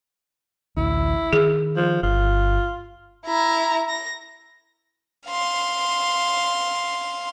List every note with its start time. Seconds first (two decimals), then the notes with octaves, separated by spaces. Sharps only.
0.77 A1 D2 E4
1.33 D#3 G#4
1.76 F3
2.03 G1 F4
3.26 E4 A#5
3.89 A#6
5.27 F5 C6